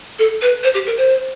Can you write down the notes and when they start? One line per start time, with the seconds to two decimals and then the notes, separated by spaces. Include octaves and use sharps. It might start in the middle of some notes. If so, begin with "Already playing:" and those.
0.19 A4
0.42 B4
0.63 C5
0.74 G4
0.87 A#4
0.97 C5